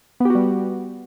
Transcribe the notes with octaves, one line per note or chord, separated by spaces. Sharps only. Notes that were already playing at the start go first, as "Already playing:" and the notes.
G3 B3 F#4 G4